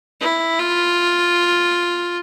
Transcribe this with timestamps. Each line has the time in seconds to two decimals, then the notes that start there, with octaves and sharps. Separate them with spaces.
0.21 E4
0.59 F4